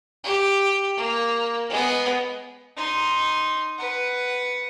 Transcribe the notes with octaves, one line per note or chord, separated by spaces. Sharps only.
G4
A#3
G#3 B3
D#4 C6
B4 F#5